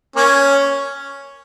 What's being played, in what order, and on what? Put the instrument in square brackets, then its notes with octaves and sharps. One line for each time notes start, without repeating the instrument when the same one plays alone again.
[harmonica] A#3 C#4